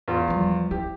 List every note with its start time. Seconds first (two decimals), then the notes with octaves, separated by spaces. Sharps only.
0.08 E2 F4
0.28 F3 G3
0.71 E4 G4